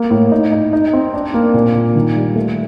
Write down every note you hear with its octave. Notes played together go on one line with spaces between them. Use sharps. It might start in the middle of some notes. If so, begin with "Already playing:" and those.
Already playing: A#3
A2
D#4
D#4
D#4
C4
D4
A#3
A#2
A#2
D#3
G3
A3